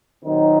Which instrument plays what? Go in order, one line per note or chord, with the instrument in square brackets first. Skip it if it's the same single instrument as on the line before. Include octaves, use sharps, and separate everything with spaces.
[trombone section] A#2 D#3 F#3 C4 D#4